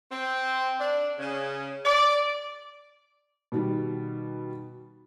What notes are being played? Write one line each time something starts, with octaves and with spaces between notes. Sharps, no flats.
C4
D4
C#3
D5
B2 D#3 G3